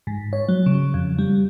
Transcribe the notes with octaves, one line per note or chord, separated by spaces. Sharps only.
G#2
C#5
F#3
C#3
F2
G3